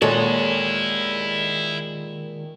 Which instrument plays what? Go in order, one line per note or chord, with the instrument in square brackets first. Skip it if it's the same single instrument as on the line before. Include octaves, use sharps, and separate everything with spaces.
[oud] D#2 A#2 G#3 [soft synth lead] D#3 [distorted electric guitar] E4 F#5 [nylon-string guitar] A4 C#5